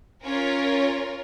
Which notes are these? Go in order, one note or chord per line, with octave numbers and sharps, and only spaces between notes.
C#4 F4 A#4 C#5